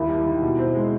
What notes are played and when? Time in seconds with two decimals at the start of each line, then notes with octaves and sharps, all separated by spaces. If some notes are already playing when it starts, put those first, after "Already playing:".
Already playing: D#2 E4
0.09 G3
0.26 D#3
0.42 B2
0.59 C4
0.74 G#3